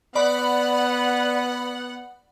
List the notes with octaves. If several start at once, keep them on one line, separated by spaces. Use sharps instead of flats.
B3 D5 F#5 B5